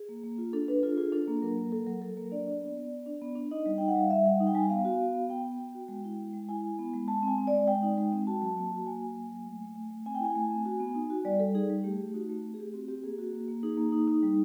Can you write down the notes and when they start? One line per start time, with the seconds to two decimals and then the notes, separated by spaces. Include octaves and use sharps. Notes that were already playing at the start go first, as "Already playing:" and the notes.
Already playing: G#4
0.09 A#3
0.23 A#3
0.38 F4
0.53 D4 A4
0.68 D4 B4
0.83 F4 A4
0.97 F4 G#4
1.12 D4 A4
1.28 A#3
1.42 F#3 A#4
1.58 A#3
1.72 F#3 A4
1.87 F#3 A#4
2.02 F#3 A4
2.17 A#3 A#4
2.31 D4 D5
2.47 D4
2.61 B3
2.77 B3
2.91 B3
3.06 D4
3.21 B3
3.35 D4
3.51 D#4 D#5
3.66 G3
3.78 D#4 G5
3.88 F#5
3.95 G3 F5
4.10 G3 E5
4.26 G3 F#5
4.40 D#4
4.47 G5
4.55 G3 G#5
4.70 B3 F5
4.85 F#4
5.00 B3
5.15 B3
5.30 B3 G5
5.45 B3
5.59 B3
5.75 F#4
5.88 G#3
6.04 E4
6.19 G#3
6.33 G#3
6.49 E4 G#5
6.63 E4
6.79 B3
6.93 G#3
7.08 G#3 A5
7.23 C4
7.28 G#5
7.38 C4
7.47 D5
7.53 G#3
7.67 G#3 G5
7.82 D#4
7.98 G#3
8.13 C4
8.27 F#4 A5
8.42 F#3
8.57 A#3
8.71 F#4
8.86 A#3 G#5
9.02 F#3
9.16 A#3
9.32 F#3
9.47 A3
9.61 A3
9.76 A3
9.90 A3
10.06 C4 G#5
10.15 G5
10.20 E4 G#5
10.35 A3
10.51 C4
10.65 F#4
10.80 B3
10.95 D#4
11.10 F#4
11.25 G3 D5
11.39 G3 A4
11.54 D#4 G#4
11.69 G3
11.84 A3 G4
11.99 A3
12.14 D#4 F#4
12.29 A3
12.44 C4
12.54 G#4
12.59 A3 G4
12.73 C4 F#4
12.88 C4 G4
13.03 A#3 G#4
13.19 F#4
13.33 A#3
13.48 A#3
13.63 D#4 G#4
13.77 A#3
13.92 D#4
14.08 D#4
14.22 G3